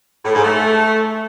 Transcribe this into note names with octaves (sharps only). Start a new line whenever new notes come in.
A2
G#2
A3